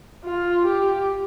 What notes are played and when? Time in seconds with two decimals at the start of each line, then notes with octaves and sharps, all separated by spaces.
0.24 F4
0.65 G4